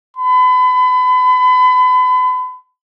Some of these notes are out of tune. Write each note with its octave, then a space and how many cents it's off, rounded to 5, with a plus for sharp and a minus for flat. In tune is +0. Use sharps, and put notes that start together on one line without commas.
B5 +35